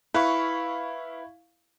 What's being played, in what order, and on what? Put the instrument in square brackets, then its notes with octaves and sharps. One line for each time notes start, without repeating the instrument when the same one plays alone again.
[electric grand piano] E4 F5 C#6 [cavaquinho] B4